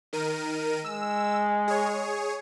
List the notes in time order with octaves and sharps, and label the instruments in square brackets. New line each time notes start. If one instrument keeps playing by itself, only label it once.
[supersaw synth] D#3 A#4 D#7
[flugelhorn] G#3 [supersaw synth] E6
[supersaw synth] G#4 C#5